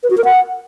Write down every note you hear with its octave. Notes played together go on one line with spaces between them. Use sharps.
B4
F#4
A#4
F#5